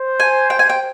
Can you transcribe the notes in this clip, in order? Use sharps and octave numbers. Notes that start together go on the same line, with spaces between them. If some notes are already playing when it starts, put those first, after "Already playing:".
Already playing: C5
G#5
G5
G#5
G5